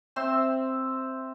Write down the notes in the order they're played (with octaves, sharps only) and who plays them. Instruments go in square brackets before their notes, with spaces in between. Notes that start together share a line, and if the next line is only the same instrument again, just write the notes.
[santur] C4 C5 E5 C6